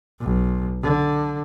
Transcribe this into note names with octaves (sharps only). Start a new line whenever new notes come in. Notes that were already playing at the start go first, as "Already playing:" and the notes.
B1
D3